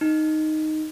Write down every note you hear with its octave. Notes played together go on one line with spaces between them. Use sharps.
D#4